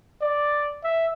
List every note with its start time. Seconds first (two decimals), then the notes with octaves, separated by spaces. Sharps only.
0.21 D5
0.84 E5